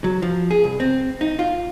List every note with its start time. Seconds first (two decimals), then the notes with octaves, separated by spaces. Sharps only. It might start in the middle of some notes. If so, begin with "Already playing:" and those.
0.04 F#3
0.22 F3
0.51 G#4
0.64 C2
0.80 C4
1.21 D#4
1.39 F4